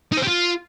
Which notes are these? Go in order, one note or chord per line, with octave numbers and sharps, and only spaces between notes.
D#4
C5
G4
F4